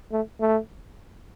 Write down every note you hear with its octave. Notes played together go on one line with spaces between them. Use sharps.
A3
A3